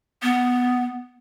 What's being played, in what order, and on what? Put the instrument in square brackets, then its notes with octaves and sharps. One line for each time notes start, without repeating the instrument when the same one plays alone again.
[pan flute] B3